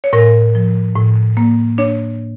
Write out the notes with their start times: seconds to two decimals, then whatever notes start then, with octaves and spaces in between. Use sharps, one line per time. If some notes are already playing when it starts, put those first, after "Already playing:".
0.04 C#5
0.13 A2 A#4
0.55 F3
0.96 A2
1.37 A#3
1.78 D4 C#5